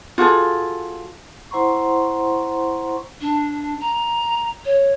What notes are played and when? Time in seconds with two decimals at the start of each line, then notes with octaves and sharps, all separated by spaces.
0.18 F4 F#4 G#4 A4
1.51 E4 C5 F#5 A#5 C6 C#6
3.21 D4
3.81 A#5
4.65 C#5